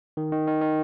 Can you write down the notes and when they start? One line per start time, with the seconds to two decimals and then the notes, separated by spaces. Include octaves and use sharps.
0.17 D#3
0.32 D#3
0.48 D#3
0.62 D#3